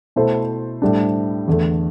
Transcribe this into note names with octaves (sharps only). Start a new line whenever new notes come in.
B2 A3 E4 A4 C5
A2 G3 D4
E2 D3 A3